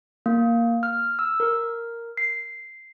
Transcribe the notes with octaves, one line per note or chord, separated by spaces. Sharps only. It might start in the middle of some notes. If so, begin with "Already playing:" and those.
A#3
F6
E6
A#4
C7